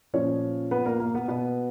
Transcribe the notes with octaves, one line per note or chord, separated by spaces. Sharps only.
A#2 F3 C#4 C#5
B3 B4
A#3 A#4
A#3 A#4
B3 B4
B2 B3 B4